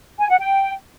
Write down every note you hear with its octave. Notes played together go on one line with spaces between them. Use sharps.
G#5
F#5
G5